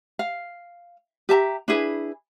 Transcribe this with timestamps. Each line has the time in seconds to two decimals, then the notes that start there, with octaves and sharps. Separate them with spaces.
0.19 F5
1.29 G4 E5 A5 A#5
1.68 D4 E4 G#4 B4